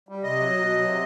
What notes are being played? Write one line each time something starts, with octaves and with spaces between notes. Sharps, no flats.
G3
C3 D#5
F#3
B2
F#3
C3